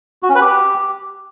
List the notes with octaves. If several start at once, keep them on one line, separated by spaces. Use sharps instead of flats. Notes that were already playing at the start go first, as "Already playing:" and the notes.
F#4
C#4
B4
G4